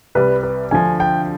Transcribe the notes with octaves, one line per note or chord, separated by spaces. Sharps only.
C2 C3 G3 B4
B4
D2 D3 F3 G#5
G5